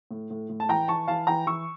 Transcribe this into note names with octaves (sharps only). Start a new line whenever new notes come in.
A2
A2
A2
A5
E3 G5 A#5
E3 A5 C#6
E3 F5 A5
E3 G5 A#5
E3 C#6 E6